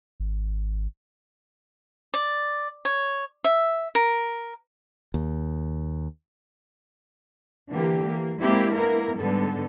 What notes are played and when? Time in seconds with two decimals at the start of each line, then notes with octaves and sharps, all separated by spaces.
0.20 G#1
2.14 D5
2.85 C#5
3.44 E5
3.95 A#4
5.14 D#2
7.70 D3 E3 A#3 G4
8.06 E3 A#3
8.40 G#3 A#3 C4 D4 E4 G4
8.74 A#3 B3 E4 A#4
9.19 G#2 D3 G3 B3 A4